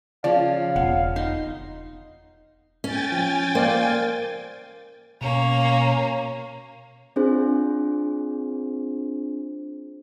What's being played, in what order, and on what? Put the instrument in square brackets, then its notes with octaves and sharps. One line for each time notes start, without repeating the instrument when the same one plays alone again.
[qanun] C#3 F3 [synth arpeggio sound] D5 [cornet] F5
[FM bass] E1 [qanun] B3 [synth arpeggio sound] F#5
[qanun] D#4 C6
[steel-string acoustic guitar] C#4 [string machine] G5 G#5 A6
[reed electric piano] F3
[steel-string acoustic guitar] A#3 [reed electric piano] C5 D5 F5
[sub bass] B2 [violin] A#3 C#4
[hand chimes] C4 D4 F4 G#4 C5